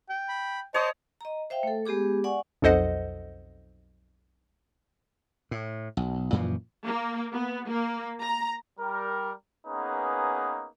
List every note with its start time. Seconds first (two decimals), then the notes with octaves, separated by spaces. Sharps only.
0.09 G5
0.29 B5
0.74 C5 C#5 D#5 A5 D#6
1.21 D#5 A#5
1.50 C5 E5 F5 G5
1.63 A3 A4
1.85 G#3 B3 G4 G#4 D6
2.24 D5 F#5 G#5 C#6
2.62 B1 F2 A4 C5 D#5 F#5
5.51 A2
5.97 B1
6.32 F#2 A#2 E3 F3
6.84 A#3
7.33 B3
7.68 A#3
8.22 A#5
8.80 G3 A#4
9.67 A#3 B3 C#4 D#4 G#4 B4